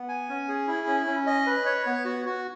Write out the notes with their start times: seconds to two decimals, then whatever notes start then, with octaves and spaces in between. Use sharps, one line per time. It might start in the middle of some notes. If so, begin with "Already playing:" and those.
Already playing: B3
0.08 G#5
0.29 C#4
0.48 G#4
0.67 E4
0.87 C#4
1.06 C#4
1.26 D#5
1.46 B4
1.65 C#5
1.86 B3
2.05 F#4
2.26 F#4